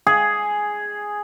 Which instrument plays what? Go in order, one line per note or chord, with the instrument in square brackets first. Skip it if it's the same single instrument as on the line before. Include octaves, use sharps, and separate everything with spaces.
[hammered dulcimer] G#4